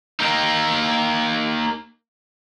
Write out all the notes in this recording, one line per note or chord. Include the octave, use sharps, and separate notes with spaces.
A#3 D#4